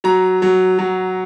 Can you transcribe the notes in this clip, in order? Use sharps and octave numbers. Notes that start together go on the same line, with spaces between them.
F#3 A#5
F#3
F#3